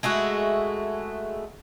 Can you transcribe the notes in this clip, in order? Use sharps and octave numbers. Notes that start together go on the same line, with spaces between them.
G#3 A3 E4 F#4